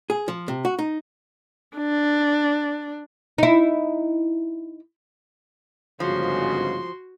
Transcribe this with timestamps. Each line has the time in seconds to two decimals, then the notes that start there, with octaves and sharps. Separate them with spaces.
0.10 G#4
0.28 F3
0.48 C3
0.65 F#4
0.79 D#4
1.77 D4
3.38 D#4 E4
6.00 G1 G#2 C#3 F3 F#4 C6